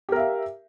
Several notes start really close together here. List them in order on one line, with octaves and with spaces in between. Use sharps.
G4 A#4 E5 F5